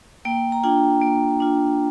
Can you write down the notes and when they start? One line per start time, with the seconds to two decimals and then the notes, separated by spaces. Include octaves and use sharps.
0.25 A#3 G5
0.52 A#5
0.64 D4 F4 G5
1.01 A#3
1.40 D4 F4